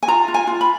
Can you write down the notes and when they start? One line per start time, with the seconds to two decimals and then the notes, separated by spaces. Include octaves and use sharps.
0.03 G#5
0.08 F4 A#5
0.28 F4
0.34 G#5
0.47 F4
0.61 B5